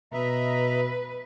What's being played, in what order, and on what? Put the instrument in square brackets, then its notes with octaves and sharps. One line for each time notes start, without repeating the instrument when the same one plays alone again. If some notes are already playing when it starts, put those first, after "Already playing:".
[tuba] B2 [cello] B4 [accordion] D#5 E5 A#5